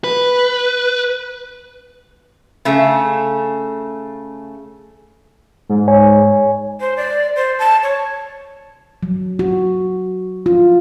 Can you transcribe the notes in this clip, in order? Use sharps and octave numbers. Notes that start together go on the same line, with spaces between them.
B4
C#3 A3
G#2
C#5 G#5
C5
D5
C5
A5
C#5
F#3
F#4
F4